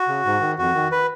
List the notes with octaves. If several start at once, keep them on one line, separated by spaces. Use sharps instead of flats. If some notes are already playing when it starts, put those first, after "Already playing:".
Already playing: F#4
C#3
G#2
D#3
F2 F#4
D#3
B4